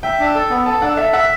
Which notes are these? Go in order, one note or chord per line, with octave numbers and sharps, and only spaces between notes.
E5 G5
D4
A4
B3
A4 A5
D4 F#5
A4 E5
E5 F#5